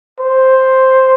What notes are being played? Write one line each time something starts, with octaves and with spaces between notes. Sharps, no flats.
C5